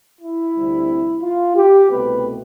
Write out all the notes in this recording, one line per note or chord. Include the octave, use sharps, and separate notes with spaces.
E4
D2 C3 G3 C4
F4
G4
C2 B2 A3 C4 B4